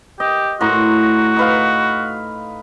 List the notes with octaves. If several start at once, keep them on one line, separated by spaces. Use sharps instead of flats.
G4 D#5
A2 F#4 A#5 C6
D#4 B4 F5